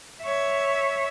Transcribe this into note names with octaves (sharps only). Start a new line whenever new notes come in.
C#5 E5